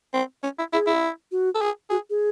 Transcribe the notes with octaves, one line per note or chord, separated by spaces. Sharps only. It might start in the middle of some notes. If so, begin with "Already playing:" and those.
C4
C#4
E4
E4 G#4
E4
F#4
A4
G#4
F#4 G#4
G#4